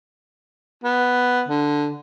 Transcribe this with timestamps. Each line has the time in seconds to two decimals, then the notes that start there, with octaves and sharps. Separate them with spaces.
0.84 B3
1.48 D3